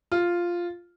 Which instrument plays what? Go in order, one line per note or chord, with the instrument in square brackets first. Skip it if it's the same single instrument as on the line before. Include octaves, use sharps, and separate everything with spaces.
[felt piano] F4